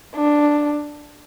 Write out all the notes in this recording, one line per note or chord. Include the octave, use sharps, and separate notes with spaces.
D4